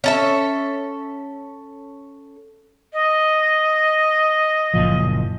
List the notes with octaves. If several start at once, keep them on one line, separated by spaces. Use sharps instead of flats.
C#4 A4 E5
D#5
F#1 A#2 F3